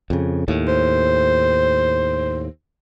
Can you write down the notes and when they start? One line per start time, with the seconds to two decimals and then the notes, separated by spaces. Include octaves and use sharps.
0.10 F2 C#3
0.48 D#2 A2
0.68 C5